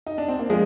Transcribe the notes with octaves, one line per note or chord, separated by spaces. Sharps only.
D#4
D4
C4
A#3
F3 G#3 G#4